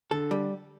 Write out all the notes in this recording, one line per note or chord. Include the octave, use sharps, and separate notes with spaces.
D3 A4
G3